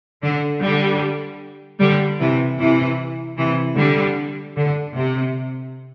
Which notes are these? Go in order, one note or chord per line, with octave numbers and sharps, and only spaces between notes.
D3
D3 G3
D3 G3
C3 E3
C3 E3
C3 E3
D3 G3
D3
C3